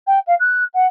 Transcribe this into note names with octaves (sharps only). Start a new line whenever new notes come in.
G5
F5
F#6
F#5